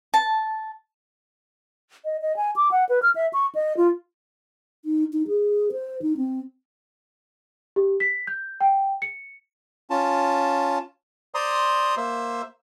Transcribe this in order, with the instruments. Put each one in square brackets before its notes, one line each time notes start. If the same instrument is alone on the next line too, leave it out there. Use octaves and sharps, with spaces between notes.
[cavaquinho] A5
[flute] D#5
D#5
G#5
D6
F#5
B4
F6
E5
C#6
D#5
F4
[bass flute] D#4
D#4
G#4
C5
D#4
C4
[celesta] G4
B6
G6
G5
C#7
[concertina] C#4 F4 A5
C5 D5 A#5 C6 D#6
A#3 C5 E5